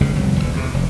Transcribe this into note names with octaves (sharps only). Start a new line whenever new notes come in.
F#1 C#2 C#3
G1 C2 F2 F#3
D#1 B1 D3
E2 C3
F1